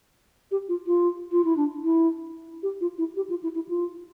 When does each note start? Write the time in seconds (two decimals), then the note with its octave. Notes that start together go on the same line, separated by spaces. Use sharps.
0.51 G4
0.69 F4
0.87 F4
1.32 F4
1.45 E4
1.57 D4
1.84 E4
2.63 G4
2.81 F4
2.98 E4
3.16 G4
3.30 F4
3.43 E4
3.55 E4
3.69 F4